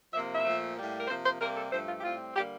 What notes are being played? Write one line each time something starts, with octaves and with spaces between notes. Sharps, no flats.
C3 F3 A#3 E5
E5
A#2 F3 A3
A2 G3 A#3
A#4
C3 F3 A#3 C5
C5
C3 G3 A#3 A#4
A4
G2 F3 A3 C5
F4
G4
A2 G3 C4 F4
D3 G3 A#3 G4